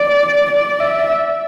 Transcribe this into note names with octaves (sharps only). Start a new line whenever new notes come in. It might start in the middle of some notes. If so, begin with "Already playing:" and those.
Already playing: D5
D5
E5